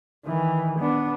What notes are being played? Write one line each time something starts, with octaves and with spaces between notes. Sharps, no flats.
D#3 E3
B3 D4